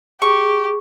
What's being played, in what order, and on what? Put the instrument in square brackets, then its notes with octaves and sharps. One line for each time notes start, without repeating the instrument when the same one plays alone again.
[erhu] G4 [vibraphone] G#4 [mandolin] C#6